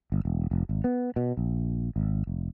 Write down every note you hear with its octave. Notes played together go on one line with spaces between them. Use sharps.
G1
E1
F1
G#1
B3
B2
A#1
G#1
F1